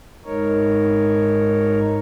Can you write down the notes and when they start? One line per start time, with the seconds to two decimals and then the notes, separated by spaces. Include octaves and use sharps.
0.25 G#2 D#4 A#4 C#5